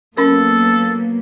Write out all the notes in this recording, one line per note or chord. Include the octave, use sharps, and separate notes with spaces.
F#3 A#3 B3 C#4 A4 A#4